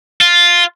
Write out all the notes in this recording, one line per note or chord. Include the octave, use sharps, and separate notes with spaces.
F4